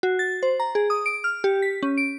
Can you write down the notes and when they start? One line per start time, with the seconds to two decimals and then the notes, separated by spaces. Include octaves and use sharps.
0.03 F#4
0.19 A6
0.43 C5
0.60 A#5
0.75 G#4
0.90 D#6
1.06 D7
1.24 F6
1.44 G4
1.62 B6
1.83 C#4
1.98 D7